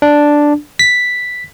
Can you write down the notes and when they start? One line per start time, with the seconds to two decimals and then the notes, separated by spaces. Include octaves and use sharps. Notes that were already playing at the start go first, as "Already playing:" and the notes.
0.02 D4
0.79 B6